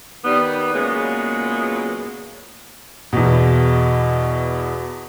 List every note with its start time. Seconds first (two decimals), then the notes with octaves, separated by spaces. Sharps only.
0.24 D#3 G3 B3
0.73 A#2 C#3 F#3 G#3 B3
3.13 E2 B2